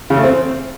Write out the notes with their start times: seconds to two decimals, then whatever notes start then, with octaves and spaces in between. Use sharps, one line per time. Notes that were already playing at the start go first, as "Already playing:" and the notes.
0.10 C#3
0.17 A3
0.24 C4